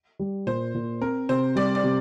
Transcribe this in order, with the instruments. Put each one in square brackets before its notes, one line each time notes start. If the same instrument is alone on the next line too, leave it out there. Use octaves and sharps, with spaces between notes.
[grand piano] G3
[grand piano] A#2 [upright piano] C5
[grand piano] A#2
[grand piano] C4 [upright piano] A#4
[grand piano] C3 [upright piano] C5
[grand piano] G3 [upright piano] D5
[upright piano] D5
[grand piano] C3